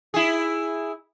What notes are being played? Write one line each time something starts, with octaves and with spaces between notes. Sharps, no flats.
E4 G#4